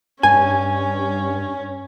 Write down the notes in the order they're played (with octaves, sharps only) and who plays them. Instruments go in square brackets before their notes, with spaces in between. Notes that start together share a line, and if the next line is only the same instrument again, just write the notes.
[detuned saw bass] G2 [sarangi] C#4 [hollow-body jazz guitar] G#5